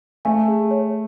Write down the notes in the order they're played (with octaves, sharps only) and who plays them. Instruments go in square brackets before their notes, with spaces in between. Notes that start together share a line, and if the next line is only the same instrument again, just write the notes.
[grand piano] A3 [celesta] G#5
[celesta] G#4
C#5